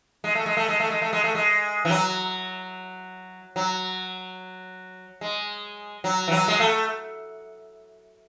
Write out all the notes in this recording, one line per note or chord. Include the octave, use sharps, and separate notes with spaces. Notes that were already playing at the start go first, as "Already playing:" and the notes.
G#3
A3
G#3
A3
G#3
A3
G#3
A3
G#3
A3
G#3
E3
F#3
F#3
G#3
F#3
E3
F#3
G#3
A3